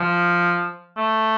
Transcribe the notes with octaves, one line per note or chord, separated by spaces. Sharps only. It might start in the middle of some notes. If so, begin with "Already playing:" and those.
Already playing: F3
A3